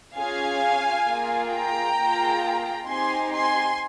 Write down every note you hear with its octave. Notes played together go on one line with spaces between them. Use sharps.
C#4 F4 G#4 F5 G#5
A#3 F4 G#4
G5 A#5
A#3 F4 G#4
C4 D#4 G4 G#5 C6
G#5 C6